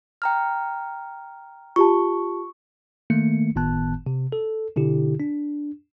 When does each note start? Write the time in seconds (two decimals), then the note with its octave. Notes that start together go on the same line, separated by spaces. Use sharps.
0.22 G5 A#5 F6
1.76 F4 G4 A5 C#6
3.10 D#3 A3 A#3 C#7
3.56 G1 A2 D#3 B3 A5 F#6
4.06 C3
4.32 A4
4.76 B2 D3 E4 G4
5.20 D4